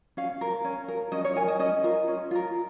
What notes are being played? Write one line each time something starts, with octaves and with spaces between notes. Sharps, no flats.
C#4 F5
A#4
C#4
A#4
C#4 D#5
C#5
A#4 G#5
D#5
C#4 D#5
F4 A#4
C#4
F4 A#4